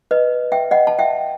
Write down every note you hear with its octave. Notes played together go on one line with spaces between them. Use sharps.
B4 D#5
E5 G5
D#5 F#5
A5
E5 G5